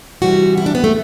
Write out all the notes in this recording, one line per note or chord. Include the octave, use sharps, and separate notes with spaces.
C3 E3 G3 F#4
E4
D4
B3
A3